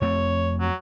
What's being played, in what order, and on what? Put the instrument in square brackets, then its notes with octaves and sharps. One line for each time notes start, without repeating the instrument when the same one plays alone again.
[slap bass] F2 A3 C4 [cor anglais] C#5
[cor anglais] F#3